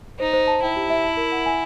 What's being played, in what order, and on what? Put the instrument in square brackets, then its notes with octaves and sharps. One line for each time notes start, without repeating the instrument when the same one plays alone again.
[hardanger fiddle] D#4 [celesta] C5
[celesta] C5
A5
[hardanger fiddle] E4 [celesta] G5
[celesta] G4
E5
A5
A#4
F#5
G#5